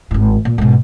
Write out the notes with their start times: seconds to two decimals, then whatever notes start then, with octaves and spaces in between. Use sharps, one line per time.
0.11 G#1 A2
0.45 A#2
0.58 G#2 B2